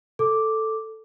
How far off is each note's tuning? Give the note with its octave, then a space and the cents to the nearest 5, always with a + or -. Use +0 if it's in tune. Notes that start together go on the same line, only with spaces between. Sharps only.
A4 +0 D6 +0